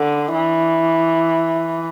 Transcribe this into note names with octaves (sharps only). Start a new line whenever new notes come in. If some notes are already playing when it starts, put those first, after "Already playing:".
Already playing: D3
E3